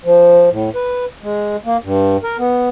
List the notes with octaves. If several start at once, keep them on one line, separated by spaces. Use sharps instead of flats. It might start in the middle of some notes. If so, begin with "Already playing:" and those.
F3
A2
B4
G#3
A#3
G2
A#4
B3